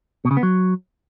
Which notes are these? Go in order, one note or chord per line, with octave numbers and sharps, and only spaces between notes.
B2
C#3
B3
F#3